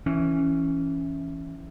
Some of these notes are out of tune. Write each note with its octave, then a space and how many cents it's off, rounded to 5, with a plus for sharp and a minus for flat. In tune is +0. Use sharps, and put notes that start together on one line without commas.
E3 +0 C#4 -5